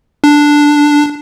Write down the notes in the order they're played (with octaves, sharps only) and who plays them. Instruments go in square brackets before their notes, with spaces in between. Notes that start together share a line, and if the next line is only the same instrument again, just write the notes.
[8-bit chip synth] D4